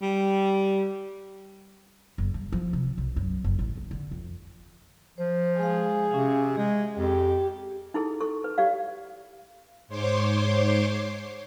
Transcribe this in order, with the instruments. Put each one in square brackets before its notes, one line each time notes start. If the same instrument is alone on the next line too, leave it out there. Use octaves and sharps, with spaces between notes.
[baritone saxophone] G3
[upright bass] F#1
G2
F3
C3
B1
F#2
F#1
A1
F#1
D3
F2
[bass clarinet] F3 [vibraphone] C5
[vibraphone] G#3 F5 [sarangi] G#4
[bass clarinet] C3 [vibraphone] C#4 F5
[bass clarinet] G#3 [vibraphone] G#4
[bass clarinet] F2 [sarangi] G4
[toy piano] D#4 E4 G#4 A4
A4 C#6
B4
G4 D5 F5
[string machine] G#2 C5 C#5 C6 D6